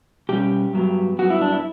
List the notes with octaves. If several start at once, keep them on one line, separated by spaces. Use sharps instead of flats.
B2 G3 C#4 G4
G2 F#3 B3
G2 F#3 B3 F#4
E4
D4
E4